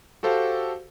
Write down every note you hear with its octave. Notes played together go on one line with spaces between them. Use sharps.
F#4 G4 A4 C5 F5